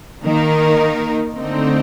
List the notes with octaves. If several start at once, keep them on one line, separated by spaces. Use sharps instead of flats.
D#3 A#3 D#4 A#4
D3 A3 C4 D#4